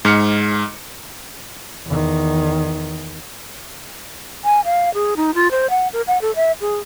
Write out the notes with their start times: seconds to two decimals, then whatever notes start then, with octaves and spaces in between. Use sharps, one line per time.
0.05 G#2 F6 C#7
1.86 E2 D#3
4.44 G#5
4.65 F5
4.94 G#4
5.17 D#4
5.35 F4
5.51 C5
5.70 F#5
5.93 A#4
6.07 F#5
6.22 A4
6.36 E5
6.61 G#4